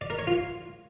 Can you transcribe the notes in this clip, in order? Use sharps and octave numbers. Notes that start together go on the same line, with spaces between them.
D5
A#4
C#5
F4